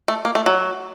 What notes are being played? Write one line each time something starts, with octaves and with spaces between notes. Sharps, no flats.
A3
A#3
A3
F#3